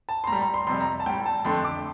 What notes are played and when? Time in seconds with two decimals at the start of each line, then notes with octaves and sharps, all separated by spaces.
0.09 A5
0.24 C6
0.27 A2 G3 A#5
0.41 A#5
0.54 C6
0.67 F2 C3 G3 C6
0.81 A#5
1.00 A5
1.06 A2 G3 G5
1.26 A5
1.45 F2 D3 A3 C6
1.64 D6